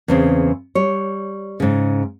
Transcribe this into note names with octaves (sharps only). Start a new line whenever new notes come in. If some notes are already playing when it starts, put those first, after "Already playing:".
E2 C#3 C4
G3 C#5
G#2 C#3